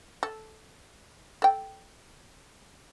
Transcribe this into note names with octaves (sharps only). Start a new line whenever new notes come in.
A4
A4 G5